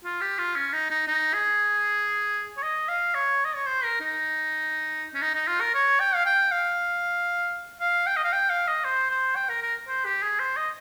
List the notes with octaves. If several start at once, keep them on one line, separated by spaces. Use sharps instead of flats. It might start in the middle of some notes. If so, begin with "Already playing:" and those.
F4
G4
F4
C#4
D#4
D#4
D#4
G#4
C#5
D#5
F5
C#5
D#5
C#5
C5
A#4
D#4
C#4
D#4
D#4
F4
A#4
C#5
G5
F5
G5
F5
F5
G5
D#5
F5
G5
F5
D#5
C5
C5
G5
A#4
A#4
C5
G4
G#4
C5
D#5